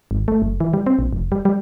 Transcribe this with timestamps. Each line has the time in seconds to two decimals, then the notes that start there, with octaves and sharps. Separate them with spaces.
0.11 G#1
0.28 A3
0.42 F#1
0.60 E3
0.74 G3
0.86 C4
0.99 A#1
1.13 F1
1.32 G3
1.45 G3